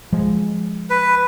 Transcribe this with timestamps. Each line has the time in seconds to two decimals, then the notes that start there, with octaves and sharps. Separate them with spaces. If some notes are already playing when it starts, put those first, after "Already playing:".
0.12 F3 G#3
0.90 B4